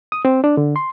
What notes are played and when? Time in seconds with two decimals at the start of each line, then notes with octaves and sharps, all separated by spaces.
0.12 D#6
0.25 C4
0.44 D4
0.57 D3
0.76 C6